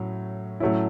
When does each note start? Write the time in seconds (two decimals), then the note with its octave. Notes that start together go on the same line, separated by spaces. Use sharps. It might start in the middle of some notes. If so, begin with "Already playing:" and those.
Already playing: A2 F#3 C#4
0.60 A2 F#3 A3 C#4 E4